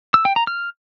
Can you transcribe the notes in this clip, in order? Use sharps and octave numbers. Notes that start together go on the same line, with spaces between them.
E6
G5
A#5
F6